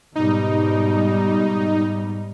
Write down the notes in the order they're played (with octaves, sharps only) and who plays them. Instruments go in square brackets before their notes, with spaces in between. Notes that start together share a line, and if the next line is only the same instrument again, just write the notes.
[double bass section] G#2 B2 G3 [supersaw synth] D#4